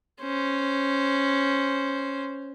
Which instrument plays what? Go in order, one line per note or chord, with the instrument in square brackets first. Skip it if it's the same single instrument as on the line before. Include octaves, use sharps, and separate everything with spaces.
[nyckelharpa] C#4 C5